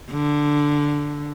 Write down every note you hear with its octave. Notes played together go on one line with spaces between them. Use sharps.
D3